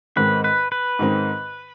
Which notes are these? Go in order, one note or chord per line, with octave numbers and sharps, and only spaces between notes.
G#2 D#3 G#3 C4 B4
B4
B4
G#2 D#3 G#3 C4